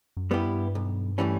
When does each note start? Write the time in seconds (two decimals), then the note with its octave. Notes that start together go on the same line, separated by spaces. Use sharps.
0.17 F#2
0.31 G3 B3 E4 G4
0.46 G2
0.75 B1
1.18 A2 E3 G3 C#4